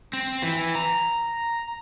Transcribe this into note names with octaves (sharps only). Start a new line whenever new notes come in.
C4
E3
A#5